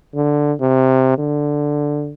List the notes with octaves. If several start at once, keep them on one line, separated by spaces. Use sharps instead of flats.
D3
C3
D3